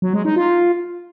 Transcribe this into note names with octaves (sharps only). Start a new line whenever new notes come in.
F#3
G#3
D#4
F4